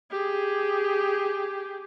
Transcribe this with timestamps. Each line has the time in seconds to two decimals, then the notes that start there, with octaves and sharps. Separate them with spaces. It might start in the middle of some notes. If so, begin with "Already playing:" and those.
0.11 G4 G#4